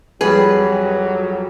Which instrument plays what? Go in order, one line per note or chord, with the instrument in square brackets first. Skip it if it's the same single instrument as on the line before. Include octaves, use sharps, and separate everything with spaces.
[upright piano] F2 G3 [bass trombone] F#3 [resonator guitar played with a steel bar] G#4 B4